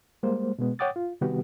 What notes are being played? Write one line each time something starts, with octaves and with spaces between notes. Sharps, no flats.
G3 G#3 A#3 C5
B2 G#3 B3
C#5 F#5 G5 D6 D#6 A6
F4
C3 D#3 G3 B3 F#4 G4